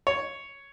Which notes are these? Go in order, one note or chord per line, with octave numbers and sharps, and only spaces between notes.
C#5